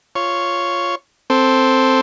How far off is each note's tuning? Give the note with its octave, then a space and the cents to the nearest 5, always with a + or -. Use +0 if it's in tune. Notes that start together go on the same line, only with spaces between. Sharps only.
F4 +0 C#5 +0
C4 +0 A4 +5